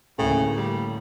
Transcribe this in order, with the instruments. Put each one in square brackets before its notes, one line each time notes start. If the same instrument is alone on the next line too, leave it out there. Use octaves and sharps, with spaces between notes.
[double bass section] D2 A3 A#3 [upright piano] A2 [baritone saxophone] C#3
[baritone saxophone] G3